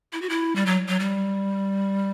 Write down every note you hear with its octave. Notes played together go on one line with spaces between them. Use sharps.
E4
F#4
E4
G3
F#3
F#3
G3